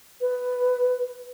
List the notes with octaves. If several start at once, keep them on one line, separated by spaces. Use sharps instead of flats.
B4